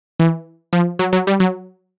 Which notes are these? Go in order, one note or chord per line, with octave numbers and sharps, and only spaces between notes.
E3
F3
F#3
F#3
G3
F#3